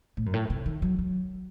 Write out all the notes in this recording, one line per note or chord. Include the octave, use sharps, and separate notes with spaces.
A2
F#2
A2
C3
D#3
F#3
F#3